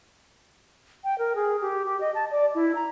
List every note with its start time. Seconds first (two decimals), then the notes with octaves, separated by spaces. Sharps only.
1.04 G5
1.18 A#4
1.35 G#4
1.61 G4
1.85 G4
2.01 D#5
2.15 A5
2.31 D5
2.55 E4
2.75 A#5